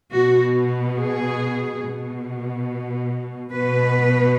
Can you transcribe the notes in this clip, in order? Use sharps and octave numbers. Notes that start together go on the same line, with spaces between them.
B2 F#4
G#4
B2
B2 B4